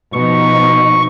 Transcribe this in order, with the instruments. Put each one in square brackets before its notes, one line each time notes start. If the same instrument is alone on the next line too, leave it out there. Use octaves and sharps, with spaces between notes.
[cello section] B2 F3 D#4 [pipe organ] C#6